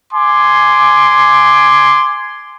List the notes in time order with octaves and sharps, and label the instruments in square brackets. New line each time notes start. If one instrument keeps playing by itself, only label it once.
[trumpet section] G#5 C6 D6